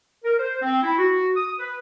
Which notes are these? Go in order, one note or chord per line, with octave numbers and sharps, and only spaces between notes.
A#4
C5
C4
E4
F#4
D#6
B4